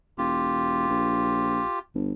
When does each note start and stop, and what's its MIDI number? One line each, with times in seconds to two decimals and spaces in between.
0.18 0.85 28
0.18 1.79 65
0.18 1.79 67
0.89 1.61 34
1.95 2.13 31